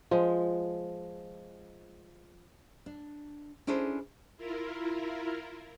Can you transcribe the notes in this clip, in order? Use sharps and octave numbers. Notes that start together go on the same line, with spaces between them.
F3 G#3
D4
C#4 D4 E4 G#4 A4 C5
E4 F4 A#4